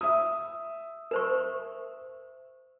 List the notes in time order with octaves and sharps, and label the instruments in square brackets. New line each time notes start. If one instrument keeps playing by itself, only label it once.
[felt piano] E5 D#6
[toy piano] A#4 C5 C#6